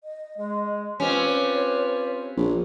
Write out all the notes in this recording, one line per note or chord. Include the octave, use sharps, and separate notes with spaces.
D#5
G#3 D#5
C4 C#4 F4 G4 B4 C#5
A#1